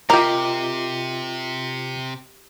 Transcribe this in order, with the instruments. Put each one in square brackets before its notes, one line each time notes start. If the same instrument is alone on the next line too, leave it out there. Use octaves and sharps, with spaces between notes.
[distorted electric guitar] C3 [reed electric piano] F4 D#5 D6 [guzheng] G4 [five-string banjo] A#4 G5